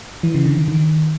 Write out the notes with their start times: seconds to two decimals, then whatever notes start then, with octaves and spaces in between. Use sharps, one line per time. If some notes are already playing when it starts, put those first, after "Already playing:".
0.23 E3
0.35 C#3
0.46 D3
0.57 D#3
0.68 D#3